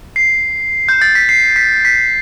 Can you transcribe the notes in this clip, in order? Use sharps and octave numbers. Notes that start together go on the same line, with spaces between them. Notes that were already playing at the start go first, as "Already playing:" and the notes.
C7
G6
A6
B6
C7
B6
B6